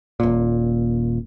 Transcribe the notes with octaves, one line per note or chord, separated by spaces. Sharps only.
D#1 A#2